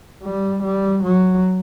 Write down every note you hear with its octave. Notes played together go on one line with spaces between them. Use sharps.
G3
G3
F#3